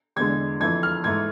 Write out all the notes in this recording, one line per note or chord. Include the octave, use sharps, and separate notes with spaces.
E2 D3 G#3 G#6
F2 E3 A3 G#6
F6
G#2 E3 A3 G#6